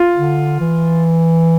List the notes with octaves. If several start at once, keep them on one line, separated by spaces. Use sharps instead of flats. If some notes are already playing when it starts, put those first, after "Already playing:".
Already playing: F4
D3
E3